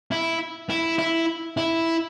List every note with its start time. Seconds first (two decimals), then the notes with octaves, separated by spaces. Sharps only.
0.12 E4
0.70 E4
0.98 E4
1.57 E4